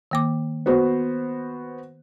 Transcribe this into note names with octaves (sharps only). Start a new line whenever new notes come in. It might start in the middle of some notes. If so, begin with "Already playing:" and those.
D#3 A#3 D6
B3 F#4 C5